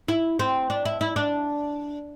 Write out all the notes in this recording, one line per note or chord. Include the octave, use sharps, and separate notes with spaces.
E4
C4
D4
E4
E4
D4